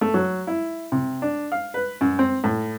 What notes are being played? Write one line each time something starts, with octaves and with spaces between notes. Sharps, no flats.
A3
F#3
E4
C3
D4
F5
B4
F#2
C4
A2